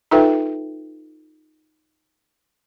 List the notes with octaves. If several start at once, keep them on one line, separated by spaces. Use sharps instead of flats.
D#4 F4 A4 B4 E5 G5